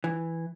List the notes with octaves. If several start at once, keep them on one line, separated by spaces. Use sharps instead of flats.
E3